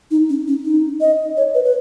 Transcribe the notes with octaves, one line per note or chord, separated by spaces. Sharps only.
D#4
C#4
C#4
D#4
D#5
C#5
B4
B4